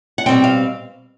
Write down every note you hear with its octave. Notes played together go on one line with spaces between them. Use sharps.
F#5
B2 G3 C4 G5
F5